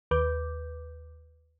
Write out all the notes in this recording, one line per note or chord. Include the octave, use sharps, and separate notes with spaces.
D#2 B4 D6 G6